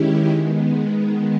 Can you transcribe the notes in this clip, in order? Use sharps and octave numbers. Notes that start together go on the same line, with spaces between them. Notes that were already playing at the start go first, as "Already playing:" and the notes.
Already playing: D#3 G#3 C#4 E4 G4
D#3 G#3 B3